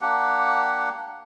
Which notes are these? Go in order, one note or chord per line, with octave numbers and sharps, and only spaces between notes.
A#3 D4 G4 F#5